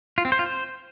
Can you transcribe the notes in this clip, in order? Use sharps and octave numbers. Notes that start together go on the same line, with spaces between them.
F4
C4
C5
F4
C5